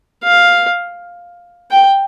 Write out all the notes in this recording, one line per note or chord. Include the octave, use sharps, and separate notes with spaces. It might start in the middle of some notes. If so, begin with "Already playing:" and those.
F5
G5